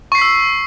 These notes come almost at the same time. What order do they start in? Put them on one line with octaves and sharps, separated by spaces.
C#6 C7 B6 E6